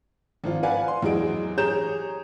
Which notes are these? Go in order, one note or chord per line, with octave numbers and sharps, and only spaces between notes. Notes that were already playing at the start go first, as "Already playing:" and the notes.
G#1 F3 F4
B4 D5 F5 F#5 G#5
C6
E2 F#3 E4 G#4 D#5 D7
G4 G#4 C#5 A#5 G6 E7